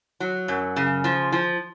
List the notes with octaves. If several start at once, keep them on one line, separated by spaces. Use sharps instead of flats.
F#3
F#2
C#3
F3
F3